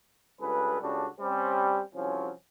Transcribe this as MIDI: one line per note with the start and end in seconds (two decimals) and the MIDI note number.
0.41 0.77 37
0.41 0.77 43
0.41 0.77 68
0.41 0.77 69
0.41 0.77 71
0.81 1.06 37
0.81 1.06 49
0.81 1.06 55
0.81 1.06 62
0.81 1.06 66
0.81 1.06 69
1.20 1.79 55
1.20 1.79 60
1.20 1.79 61
1.94 2.30 36
1.94 2.30 53
1.94 2.30 54
1.94 2.30 61